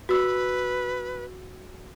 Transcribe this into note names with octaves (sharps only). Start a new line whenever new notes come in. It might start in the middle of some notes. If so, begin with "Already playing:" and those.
F#4 B4 E6